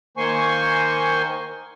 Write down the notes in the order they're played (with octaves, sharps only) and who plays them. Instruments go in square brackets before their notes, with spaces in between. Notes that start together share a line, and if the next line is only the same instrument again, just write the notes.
[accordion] D#3 A#3 C5 G#5 C6 C#6